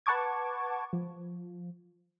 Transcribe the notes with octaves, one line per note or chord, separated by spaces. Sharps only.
B4 F#5 A5 C#6 D6 G#6
F3